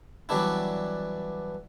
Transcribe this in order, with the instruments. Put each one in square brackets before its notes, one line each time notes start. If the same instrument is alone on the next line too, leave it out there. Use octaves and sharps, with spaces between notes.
[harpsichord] E3 F#3 G3 B3 D4 E4